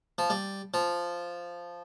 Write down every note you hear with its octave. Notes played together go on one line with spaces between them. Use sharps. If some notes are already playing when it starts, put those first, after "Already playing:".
F3
G3
F3